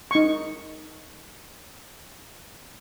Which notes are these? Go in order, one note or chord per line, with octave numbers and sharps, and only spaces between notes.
D#4 C#6